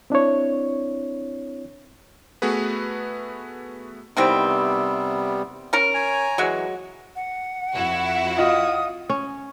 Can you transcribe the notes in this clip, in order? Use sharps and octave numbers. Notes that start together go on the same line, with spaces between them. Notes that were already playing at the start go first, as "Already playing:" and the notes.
C4 D4 E4 C#5
A3 B3 F#4 G#4 B4
C3 D#3 E3 G3 B3 C4
C#4 A#4
C#5 G#5 A#5
E3 F#3 G#3 F#4
F#5
F2 E4 F#4
F4 D#5 D#6
C#4